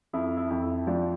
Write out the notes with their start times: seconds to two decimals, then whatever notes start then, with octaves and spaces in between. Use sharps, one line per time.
0.13 F2 E4
0.37 E4
0.50 F2
0.62 E4
0.87 F3 D4